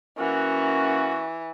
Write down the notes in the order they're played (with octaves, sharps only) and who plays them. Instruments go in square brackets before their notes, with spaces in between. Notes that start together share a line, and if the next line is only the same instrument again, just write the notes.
[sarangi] E3 [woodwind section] A#3 C#4 F#4